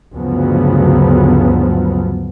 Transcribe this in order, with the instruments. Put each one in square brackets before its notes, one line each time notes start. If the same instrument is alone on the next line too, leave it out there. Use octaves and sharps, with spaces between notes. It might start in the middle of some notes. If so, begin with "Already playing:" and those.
[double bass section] D2 G2 C#3 F3 F#3 B3